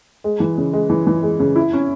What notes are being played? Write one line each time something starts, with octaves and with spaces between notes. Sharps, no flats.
G#3
E3
C#3
G#3
E3
E3
G#3
C#3
E4
C#4